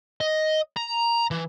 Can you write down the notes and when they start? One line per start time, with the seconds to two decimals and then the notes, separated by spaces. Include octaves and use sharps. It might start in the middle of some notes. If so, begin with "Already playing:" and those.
0.21 D#5
0.77 A#5
1.31 E3